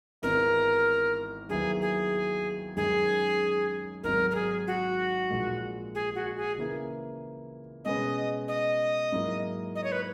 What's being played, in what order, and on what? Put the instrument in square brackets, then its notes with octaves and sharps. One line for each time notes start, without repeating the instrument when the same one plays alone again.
[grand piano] G#1 G#2 E3 B3 E4 [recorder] A#4
[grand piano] D#2 D#3 F#3 B3 E4 [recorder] G#4
[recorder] G#4
[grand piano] F#2 D#3 G#3 C#4 [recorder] G#4
[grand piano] G#1 G#2 F#3 [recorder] A#4
[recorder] A#4
G#4
F#4
[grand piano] A#1 A#2 G#3
[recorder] G#4
F#4
G#4
[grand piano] C#3 E3 A#3 E4
[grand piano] B2 G#3 C#4 G#4 B4 [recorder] D#5
[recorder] D#5
[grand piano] G#2 F#3 A#3 E4
[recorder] D#5
C#5
B4